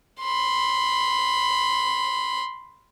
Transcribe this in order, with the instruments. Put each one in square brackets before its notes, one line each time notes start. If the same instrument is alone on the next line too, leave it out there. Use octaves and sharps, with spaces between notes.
[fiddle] B5 C6